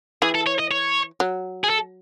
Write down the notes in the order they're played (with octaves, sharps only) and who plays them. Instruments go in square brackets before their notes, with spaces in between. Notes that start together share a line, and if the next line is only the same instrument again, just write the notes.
[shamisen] E3 [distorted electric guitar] G#4
[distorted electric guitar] A4
C#5
D#5
C#5
[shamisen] F#3
[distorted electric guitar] G#4
A4